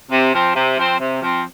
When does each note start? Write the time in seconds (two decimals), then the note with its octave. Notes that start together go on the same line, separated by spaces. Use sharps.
0.11 C3
0.33 F3 C4
0.55 C3
0.77 F3 C4
0.99 C3
1.20 F3 C4